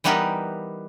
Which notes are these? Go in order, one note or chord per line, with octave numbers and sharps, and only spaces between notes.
E3 G3 B3 D#4 G4 A#4